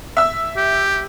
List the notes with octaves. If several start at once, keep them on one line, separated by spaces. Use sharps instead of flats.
E5 E6
G4